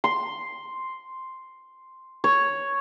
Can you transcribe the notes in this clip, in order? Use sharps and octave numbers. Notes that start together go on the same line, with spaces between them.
C6
C#5